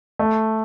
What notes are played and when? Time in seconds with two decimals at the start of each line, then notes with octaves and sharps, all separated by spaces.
0.19 A3